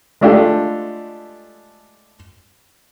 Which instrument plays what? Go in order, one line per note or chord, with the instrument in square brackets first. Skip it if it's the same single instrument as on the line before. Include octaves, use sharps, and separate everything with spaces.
[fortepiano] G#3 A3 D4 F4 G4 A4